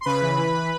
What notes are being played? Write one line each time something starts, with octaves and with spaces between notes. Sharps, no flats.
C6
C#3 B4 B5
E3
E3